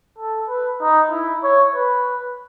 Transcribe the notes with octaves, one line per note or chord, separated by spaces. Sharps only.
A4
B4
D#4
E4
C#5
B4